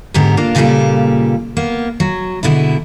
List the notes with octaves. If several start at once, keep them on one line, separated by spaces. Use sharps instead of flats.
G#2 D3 B3 G4 A#5
A#3 D4 F4
A#2 C#3 G3 A#3 F4 A4
A#3 B3
F#3
B2 D3 G#3 E4